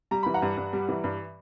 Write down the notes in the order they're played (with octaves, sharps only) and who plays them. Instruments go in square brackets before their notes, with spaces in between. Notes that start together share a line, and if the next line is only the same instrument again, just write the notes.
[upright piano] G3 A#5
E3 B5
F#5 A#5
G2
G2
G3
E3
G2